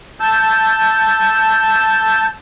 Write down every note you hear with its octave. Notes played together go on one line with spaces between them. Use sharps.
A5 E6 G6